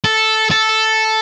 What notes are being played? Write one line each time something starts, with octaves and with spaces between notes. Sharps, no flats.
A4
A4